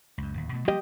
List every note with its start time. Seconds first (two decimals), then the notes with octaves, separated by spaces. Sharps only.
0.18 C#2 F#2
0.35 D1 D#2
0.52 B2 A3
0.68 F3 G3 A#3 G4 D#5